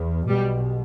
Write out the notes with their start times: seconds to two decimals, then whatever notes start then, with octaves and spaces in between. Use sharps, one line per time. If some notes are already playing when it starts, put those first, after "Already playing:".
Already playing: E2
0.28 B1 B2 G3